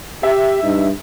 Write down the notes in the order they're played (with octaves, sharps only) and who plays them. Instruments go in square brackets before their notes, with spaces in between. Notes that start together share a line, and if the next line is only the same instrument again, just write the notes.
[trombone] G4 [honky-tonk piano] E5
[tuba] G2 [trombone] D#4